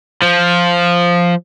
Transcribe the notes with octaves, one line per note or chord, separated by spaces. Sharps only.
F3